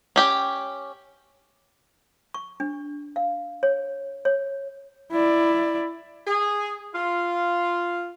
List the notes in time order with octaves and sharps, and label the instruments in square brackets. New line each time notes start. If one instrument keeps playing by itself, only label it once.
[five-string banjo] C#4 G4 G5
[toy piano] C#6
D4
F5
C#5
C#5
[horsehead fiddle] E4 D5
[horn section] G#4
F4